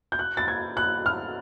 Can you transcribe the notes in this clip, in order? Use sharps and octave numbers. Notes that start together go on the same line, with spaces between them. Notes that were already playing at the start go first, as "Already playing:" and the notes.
G6
F#6
A6
G#6
F#6
F6